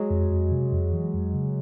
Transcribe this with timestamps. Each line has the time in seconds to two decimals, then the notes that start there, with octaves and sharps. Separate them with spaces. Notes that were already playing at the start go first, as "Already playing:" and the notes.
Already playing: F#3 G#3
0.10 F2
0.31 F2
0.52 C3
0.72 F2
0.93 E3
1.13 F2
1.34 C#3